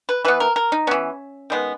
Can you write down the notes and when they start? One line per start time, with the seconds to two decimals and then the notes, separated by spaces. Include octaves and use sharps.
0.09 B4
0.25 E3 B3 B4
0.40 A#4
0.56 A#4
0.72 D#4
0.87 E3 B3 C#4
1.50 D#3 G#3 B3